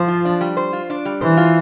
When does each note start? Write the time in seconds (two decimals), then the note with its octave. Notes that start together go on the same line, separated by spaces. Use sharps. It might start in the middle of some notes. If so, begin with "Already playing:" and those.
Already playing: F3 C5
0.08 F4
0.25 D4
0.41 G3
0.57 C5
0.73 F4
0.90 D4
1.05 G3
1.21 E3 C5
1.37 F4